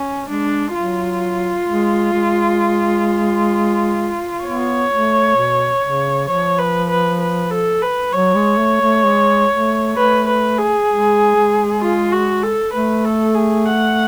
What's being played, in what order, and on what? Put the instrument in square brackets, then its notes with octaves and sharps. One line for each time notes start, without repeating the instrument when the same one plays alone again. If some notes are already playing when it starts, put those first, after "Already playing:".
Already playing: [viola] C#4
[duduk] G#3 [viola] D4
[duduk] F#3 [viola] F4
[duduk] G#3
G#3
[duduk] B3 [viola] C#5
[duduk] A3
B2
C#3
[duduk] F3 [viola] C#5
[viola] B4
B4
B4
A4
B4
[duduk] F#3 [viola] C#5
[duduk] G#3
A3
A3
G#3
A3
[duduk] A3 [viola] B4
[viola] B4
G#4
[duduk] G#3
G#3
[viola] F4
F#4
A4
[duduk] A3 [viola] B4
[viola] A4
G#4
F#5